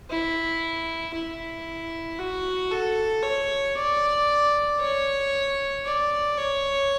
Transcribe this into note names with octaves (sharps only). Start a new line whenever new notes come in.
E4
E4
F#4
A4
C#5
D5
C#5
D5
C#5